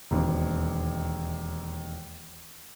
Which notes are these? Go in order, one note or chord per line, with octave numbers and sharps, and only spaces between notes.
E1 D#2 C4